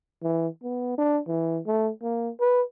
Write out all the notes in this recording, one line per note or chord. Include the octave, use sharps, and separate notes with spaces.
E3
B3
D4
E3
A3
A#3
B4